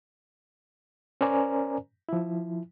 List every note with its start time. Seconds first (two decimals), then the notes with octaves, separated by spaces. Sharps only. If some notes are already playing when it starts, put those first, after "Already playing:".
1.21 C#4 A#4 C5 D5 G#5 A#5
2.09 F3 E4